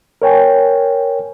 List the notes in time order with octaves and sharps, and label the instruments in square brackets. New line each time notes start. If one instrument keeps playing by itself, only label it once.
[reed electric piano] A#4 C#5 G5 G#5